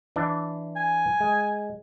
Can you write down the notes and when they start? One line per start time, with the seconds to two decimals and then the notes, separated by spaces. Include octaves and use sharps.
0.16 E3 D4
0.76 G#5
1.21 G#3